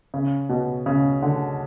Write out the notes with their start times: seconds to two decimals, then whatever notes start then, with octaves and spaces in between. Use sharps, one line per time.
0.14 C#3
0.49 B2
0.86 C#3
1.22 D3